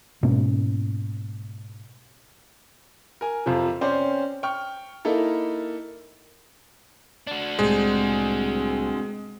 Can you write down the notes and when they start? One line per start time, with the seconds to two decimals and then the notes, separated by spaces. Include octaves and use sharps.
0.23 G#2 B2 A#3 C#4
3.21 A#4 G#5
3.46 F2 C3 F3
3.81 C4 C#4 C5 D5
4.43 G5 C#6 F6
5.05 A#3 D#4 E4 A4
7.27 D4 F#4
7.59 C2 A2 G3 G#3 C4